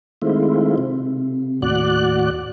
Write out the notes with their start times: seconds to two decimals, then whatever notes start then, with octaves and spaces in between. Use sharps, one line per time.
0.22 D#3 G#3 A3 C4 E4 F4
0.78 C3
1.62 D#2 A2 F#4 D5 F#6